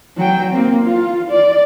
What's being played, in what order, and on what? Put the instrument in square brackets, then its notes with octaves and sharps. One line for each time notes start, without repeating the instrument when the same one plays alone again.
[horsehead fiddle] F#3 G5
A#3 C4
F4
D5